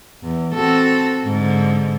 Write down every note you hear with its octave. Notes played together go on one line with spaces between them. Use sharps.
E2
C4 F#4 A4
G#2 D3